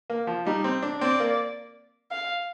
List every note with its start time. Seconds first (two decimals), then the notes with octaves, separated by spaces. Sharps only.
0.10 A#3
0.27 F3
0.46 G3 D#4
0.64 C4
0.82 D4
1.00 C4 D5
1.20 A#3
2.11 F5